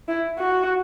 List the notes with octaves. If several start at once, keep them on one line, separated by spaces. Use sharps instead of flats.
E4
F#4